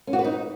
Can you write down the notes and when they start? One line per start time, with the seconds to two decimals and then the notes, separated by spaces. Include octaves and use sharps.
0.07 C#4
0.13 F#4
0.19 B4
0.24 D#4